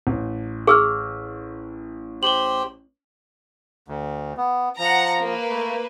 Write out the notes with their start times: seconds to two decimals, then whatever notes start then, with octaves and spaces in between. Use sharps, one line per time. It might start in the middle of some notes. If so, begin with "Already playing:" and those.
0.07 A1
0.67 G#4 C#6 E6 F6
2.23 G4 C5 F#7 G7
3.88 D2
4.37 B3
4.79 F3 F#5 A#5
5.19 A#3 B4
5.49 A3